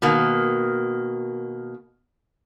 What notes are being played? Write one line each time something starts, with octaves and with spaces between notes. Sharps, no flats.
B2 D#3 A#3